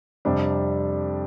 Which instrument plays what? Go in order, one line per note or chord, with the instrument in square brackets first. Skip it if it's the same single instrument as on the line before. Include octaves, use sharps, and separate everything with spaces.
[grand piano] F2 C3 G3 D4